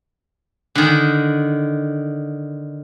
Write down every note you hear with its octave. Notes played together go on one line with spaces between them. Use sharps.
D3 D#3